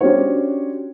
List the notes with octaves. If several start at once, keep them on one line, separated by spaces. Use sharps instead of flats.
C#4 D4 F#4 G4 C5 C#5